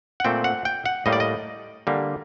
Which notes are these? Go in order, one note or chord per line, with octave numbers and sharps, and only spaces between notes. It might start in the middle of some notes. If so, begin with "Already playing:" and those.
F#5
A#2 A3 C4 G5
F#5
G5
F#5
A2 G3 A#3 D#5
D5
D#5
D3 G3 A#3